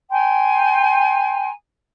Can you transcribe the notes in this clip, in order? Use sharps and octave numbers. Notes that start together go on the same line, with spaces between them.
G5 G#5 A#5 C6